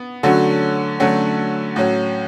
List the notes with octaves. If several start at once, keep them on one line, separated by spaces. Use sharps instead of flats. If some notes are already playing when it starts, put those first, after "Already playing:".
Already playing: B3
D3 F#3 A3 C#4 F#4
D3 F#3 A3 C#4 F#4
A2 F#3 C#4 F#4